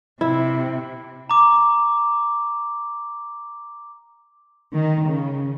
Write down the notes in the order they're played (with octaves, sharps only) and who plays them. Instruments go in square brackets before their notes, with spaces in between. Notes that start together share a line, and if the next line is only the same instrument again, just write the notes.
[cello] C3 [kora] E4
[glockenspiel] A#5 D6
[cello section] D#3
C#3